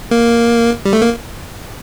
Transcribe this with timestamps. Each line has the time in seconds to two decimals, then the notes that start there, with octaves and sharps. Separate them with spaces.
0.11 A#3
0.85 G3
0.93 A3
1.02 A#3